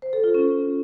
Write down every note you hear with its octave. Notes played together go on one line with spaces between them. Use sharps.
C5
A4
F4
C#4